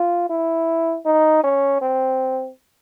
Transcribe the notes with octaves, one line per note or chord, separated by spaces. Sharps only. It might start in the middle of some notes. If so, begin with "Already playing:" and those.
Already playing: F4
E4
D#4
C#4
C4